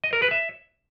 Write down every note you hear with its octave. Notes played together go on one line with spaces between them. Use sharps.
D#5
A#4
B4
E5